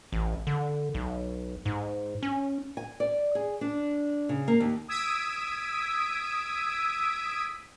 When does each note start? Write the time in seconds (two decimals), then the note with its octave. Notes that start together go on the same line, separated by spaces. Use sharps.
0.12 A1
0.47 D3
0.94 B1
1.66 G#2
2.23 C#4
2.77 G#5
3.00 D5
3.35 G#4
3.61 D4
4.29 C#3
4.48 A#3
4.60 D#2
4.88 D#6 E6 G#6 B6 D7 D#7